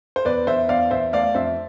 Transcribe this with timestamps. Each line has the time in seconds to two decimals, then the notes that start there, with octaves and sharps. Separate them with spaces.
0.16 C5
0.25 E2 B4 D5
0.47 E2 C5 E5
0.69 E2 D5 F5
0.91 E2 C5 E5
1.13 A3 D5 F5
1.35 F2 C5 E5